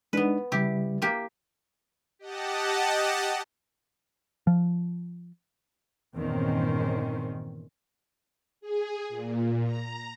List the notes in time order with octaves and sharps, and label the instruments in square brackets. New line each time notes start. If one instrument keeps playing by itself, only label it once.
[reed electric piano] G#3 D4 D#4 [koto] B3 B4
[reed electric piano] C#3 G3 [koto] E4 G4
[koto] A#3 G4
[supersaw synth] G4 D#5 F#5 A5
[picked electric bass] F3
[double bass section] G1 E2 A#2 D#3 C4 C#4
[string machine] G#4
A#2
A#5